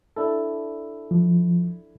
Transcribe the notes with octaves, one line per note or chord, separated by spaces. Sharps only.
D4 E4 A4
F3